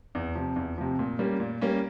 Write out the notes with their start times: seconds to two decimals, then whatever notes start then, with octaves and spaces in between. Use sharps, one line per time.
0.15 E2
0.35 C3 F3
0.56 E2
0.78 C3 F3
0.99 A#2
1.19 G3 A#3 C#4
1.40 A#2
1.61 G3 A#3 C#4